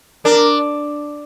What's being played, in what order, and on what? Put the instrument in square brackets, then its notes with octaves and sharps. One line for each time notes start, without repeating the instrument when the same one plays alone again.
[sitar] D4 [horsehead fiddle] A#4